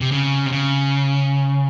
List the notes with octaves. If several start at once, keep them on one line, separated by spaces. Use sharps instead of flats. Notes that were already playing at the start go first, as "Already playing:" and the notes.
C3
C#3
C3
C#3